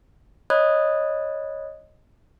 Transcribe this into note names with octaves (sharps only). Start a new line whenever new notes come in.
C#5 D#5 B5 D#6 F#6 G#6